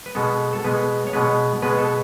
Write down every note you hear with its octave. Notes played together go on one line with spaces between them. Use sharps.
B4
B2 G#3 B3 A4
A4
B2 G#3 B3 B4
C#5
B2 G#3 B3 B4
B2 G#3 B3 B4
A4